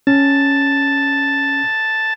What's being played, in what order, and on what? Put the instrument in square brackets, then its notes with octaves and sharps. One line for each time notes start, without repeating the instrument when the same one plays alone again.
[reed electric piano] C#4 [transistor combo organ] A5